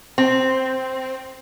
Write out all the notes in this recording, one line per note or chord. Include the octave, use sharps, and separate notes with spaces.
C4